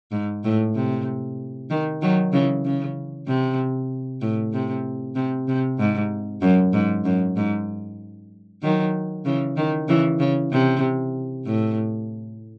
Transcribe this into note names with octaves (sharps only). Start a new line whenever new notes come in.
G#2
A2
C3
D#3
D#3 F#3
C#3 E3
C#3
C3
A2
C3
C3
C3
G#2
F#2
G#2
F#2
G#2
D#3 F#3
C#3 E3
D#3
C#3 E3
C#3
C3
A2